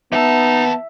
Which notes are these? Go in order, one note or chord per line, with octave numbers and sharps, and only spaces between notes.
D#2 B3 D#4 E5 A5